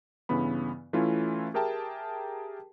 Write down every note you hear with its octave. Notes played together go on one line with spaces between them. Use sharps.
G2 C#3 E3 B3 B5
E3 A3 C#4 E4 F4
G4 G#4 A#4 E5 G5 A5